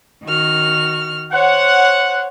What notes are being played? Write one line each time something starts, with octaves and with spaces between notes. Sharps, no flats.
D#3 F#4 F6
C5 C#5 F#5